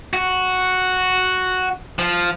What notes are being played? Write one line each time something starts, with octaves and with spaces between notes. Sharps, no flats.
F#4
F3